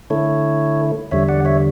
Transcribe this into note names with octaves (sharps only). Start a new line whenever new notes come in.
D3 A3 E4 A4 C#5
E2 D3 G3 C#5 E5
D5 F#5
C#5 E5